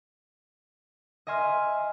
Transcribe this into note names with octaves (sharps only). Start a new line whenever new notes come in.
D#5 E5 G#5 C6 F6 D#7